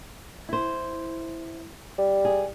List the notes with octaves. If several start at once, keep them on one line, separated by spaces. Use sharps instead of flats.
E4 C5
G3
G#4